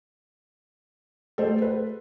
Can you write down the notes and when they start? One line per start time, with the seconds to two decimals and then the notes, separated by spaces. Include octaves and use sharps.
1.38 A3 G#4 A4 C5
1.62 B4